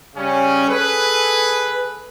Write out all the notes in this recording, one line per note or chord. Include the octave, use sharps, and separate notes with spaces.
C#3 G3 C#4
G#4 A4 B4